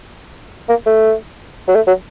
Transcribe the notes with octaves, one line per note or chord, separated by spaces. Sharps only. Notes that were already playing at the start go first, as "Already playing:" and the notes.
A#3
A3
F#3
A3
F#3